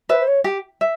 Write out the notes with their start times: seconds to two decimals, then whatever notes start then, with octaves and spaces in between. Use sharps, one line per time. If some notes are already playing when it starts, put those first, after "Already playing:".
0.09 B4 C5 E5
0.20 C5
0.27 C#5
0.44 G4
0.81 E5